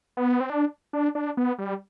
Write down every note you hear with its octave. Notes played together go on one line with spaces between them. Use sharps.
B3
C4
D4
D4
D4
B3
G3